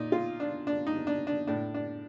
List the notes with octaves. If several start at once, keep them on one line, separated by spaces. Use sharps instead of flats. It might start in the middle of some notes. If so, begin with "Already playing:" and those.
Already playing: A#2 D#4
F4
D4
D4
D#4
D4
D4
A2 D4
D4